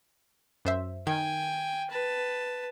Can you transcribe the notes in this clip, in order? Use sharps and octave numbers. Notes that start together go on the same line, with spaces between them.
F#2 C5 E5
D#3 G5 G#5 G#6
B4 A5